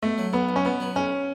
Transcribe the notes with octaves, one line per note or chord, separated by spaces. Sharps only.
B2 A3
F#3
B1 B3
B1
C#4
B2 B3
F#3
B1 C#4